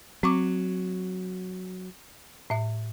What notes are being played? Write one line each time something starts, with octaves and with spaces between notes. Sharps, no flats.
F#3 C4 C#6 D6
A2 E5